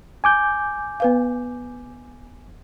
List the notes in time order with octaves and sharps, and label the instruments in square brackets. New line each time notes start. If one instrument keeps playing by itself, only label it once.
[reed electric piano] G#5 D6 G6
[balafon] B3 B4 F5